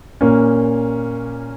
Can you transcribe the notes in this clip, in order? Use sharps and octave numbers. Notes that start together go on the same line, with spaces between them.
A#2 A#3 C#4